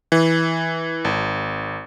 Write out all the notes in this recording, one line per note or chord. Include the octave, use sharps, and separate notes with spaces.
E3
G#1